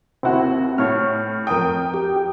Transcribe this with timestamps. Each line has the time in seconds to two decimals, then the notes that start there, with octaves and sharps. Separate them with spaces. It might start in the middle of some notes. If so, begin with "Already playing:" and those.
0.23 D#2 C4 E4 F#4
0.78 A2 C#5 F6
1.47 F2 A#4 G5 D#6
1.94 G4